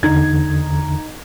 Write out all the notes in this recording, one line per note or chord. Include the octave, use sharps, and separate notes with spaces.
E2 D3 D#4 G#6